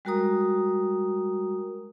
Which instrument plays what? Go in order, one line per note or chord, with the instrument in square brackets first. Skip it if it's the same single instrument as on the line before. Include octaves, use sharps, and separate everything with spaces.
[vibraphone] G3 G#3 F#4 A#4 A#5 D#6